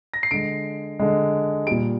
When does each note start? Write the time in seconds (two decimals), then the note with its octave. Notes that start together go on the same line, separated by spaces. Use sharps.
0.14 A#6
0.23 C7
0.31 D3 G#3 D7
1.00 D3 G#3
1.67 A#2 G3 D7